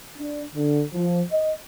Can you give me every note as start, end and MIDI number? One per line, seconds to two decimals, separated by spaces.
0.17 0.42 62
0.55 0.82 50
0.93 1.21 53
1.32 1.53 75